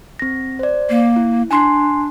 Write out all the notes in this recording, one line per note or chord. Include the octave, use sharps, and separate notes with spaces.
C4 A#6
C5 D5
A#3
E4
D4 G#5 C6 C7